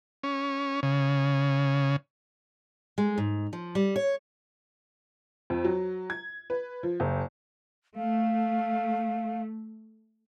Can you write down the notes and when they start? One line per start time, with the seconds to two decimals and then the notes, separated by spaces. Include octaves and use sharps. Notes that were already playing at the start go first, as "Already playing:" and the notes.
0.24 C#4
0.83 C#3
2.98 G#3
3.18 G#2
3.53 F3
3.75 G3
3.96 C#5
5.50 F2
5.64 F#3
6.10 G#6
6.50 B4
6.83 F3
7.00 F#1
7.96 A3 F5